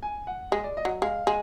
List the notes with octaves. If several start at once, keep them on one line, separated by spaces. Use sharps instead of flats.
G#5
F#5
G#3 D#5
D5
D#5
F#3
G#3 F5
G#3 G#5